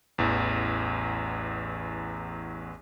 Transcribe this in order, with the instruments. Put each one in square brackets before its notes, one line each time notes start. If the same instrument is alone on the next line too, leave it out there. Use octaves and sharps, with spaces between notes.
[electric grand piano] A1 E2